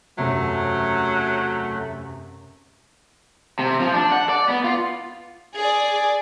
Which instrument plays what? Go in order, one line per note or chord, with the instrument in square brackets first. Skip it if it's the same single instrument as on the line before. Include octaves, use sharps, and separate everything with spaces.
[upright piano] E1 F#2 C3 [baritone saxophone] F#3 [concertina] A3
[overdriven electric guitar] C3
F3
D4
F#5
D5
B3
F4
[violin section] G#4 D5